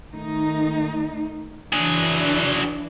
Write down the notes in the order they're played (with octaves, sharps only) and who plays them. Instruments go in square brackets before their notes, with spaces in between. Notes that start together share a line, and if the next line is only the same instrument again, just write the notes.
[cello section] D#3 A3 D#4
[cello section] E3 D4 [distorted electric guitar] F#3 G#4